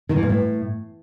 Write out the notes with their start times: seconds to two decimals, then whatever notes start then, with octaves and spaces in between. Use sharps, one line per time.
0.09 D#3
0.16 E3
0.23 A#2
0.29 A2